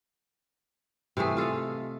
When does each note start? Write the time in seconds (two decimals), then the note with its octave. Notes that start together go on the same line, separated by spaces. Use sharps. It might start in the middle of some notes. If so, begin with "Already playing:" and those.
1.17 C3 E3 A3 G#4
1.37 F4 A4 D#5 F5